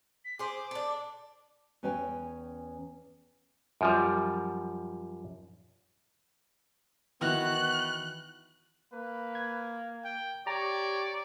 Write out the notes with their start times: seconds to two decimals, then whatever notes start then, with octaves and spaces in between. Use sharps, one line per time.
0.25 B6
0.39 G#4 C5 D6
0.71 D4 A4
1.83 E2 C#4 B4 C#5 G5 G#5
3.81 F#2 F3 G3
7.21 D#3 E3 B3 E4 F#4 A#5 F#6
8.93 A#3 B4
9.35 G#6
10.05 G5
10.47 G4 C#5 D5 A#5